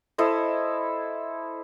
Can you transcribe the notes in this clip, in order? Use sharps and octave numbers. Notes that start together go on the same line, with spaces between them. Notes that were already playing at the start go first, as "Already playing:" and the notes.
E4 A4 C5 D#5